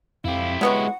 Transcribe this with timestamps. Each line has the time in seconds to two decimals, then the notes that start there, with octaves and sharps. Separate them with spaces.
0.25 F2 E4 G4 F5
0.61 F#3 G#3 B3 F#4 F#5